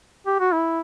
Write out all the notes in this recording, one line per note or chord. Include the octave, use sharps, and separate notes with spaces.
G4
F#4
E4